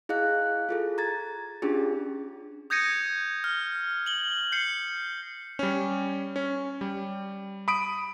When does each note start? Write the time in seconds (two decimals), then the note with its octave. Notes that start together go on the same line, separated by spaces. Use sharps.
0.09 E4 G#4 D#5 F5 F#6
0.69 F4 G#4 A4
0.98 A#5 G#6 A6
1.62 C#4 D4 F4 G4 G#4
2.70 D#6 G6 G#6 A#6 C#7 D#7
3.44 F6
4.06 F#7 G7
4.52 G6 C7 C#7
5.59 G3 C#4
6.36 C#4
6.81 G3
7.68 B5 D#6 D7